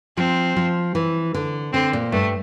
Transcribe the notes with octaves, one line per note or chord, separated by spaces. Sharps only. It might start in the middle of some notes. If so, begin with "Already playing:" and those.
F3 C4
F3
E3
D3
D3 C4
A#2
G2 A3